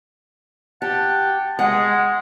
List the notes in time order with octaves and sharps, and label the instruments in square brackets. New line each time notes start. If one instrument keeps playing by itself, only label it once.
[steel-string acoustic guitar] G4 [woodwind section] F#5 G5 A5
[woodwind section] G#3 [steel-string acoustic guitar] F#5